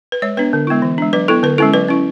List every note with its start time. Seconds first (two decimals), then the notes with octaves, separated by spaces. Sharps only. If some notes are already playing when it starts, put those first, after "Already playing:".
0.12 B4
0.22 G#3 C#5
0.37 B3 D4 B4
0.53 D3
0.67 G#3 B3 E4
0.82 E3
0.98 G#3 D4
1.13 F#3 B4
1.28 B3 E4 A4
1.43 D3 B4
1.58 G#3 C#4 E4 A4
1.74 F#3 B4
1.88 C#4 E4